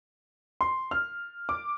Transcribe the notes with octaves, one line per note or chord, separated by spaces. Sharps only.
C6
F6
D6